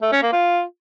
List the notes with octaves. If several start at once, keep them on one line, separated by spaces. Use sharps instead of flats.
A3
C#4
A#3
F4